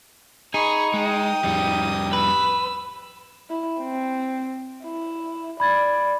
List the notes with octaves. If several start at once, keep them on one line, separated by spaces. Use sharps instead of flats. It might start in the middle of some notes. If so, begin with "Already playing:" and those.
D#4 G#4 B5 C#6
G#3 G5 D#6
F2 G3
B4 B5 E6
E4
C4
E4
D5 B5 G#6 A6